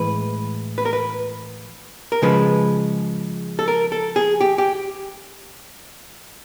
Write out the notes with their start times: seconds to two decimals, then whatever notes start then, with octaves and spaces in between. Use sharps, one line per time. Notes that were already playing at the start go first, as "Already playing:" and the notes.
Already playing: A2 E3 G#3 B4
0.78 B4
0.85 A#4
0.93 B4
2.12 A#4
2.22 C#3 F3 G#3 B4
3.59 A4
3.68 A#4
3.92 A4
4.16 G#4
4.41 G4
4.58 G4